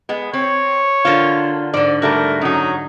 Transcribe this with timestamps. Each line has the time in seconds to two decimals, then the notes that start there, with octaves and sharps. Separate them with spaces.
0.09 G#3 B3
0.33 C4 C#5 B5
1.05 D3 F4 A#4 C5
1.74 G#2 D3 D5
2.02 G3 A3 F#4 A#4
2.41 F#2 F#3 D#4